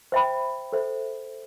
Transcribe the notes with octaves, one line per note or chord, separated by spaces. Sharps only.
C5 E5 G5 B5
A4 C5 E5